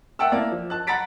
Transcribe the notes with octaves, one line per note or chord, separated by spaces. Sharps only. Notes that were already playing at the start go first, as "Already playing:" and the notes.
E5 F#5 G5 A5 E6
A#3 E4 D5
F3
A5 F#6
F#5 A#5 B5 A6 B6 D7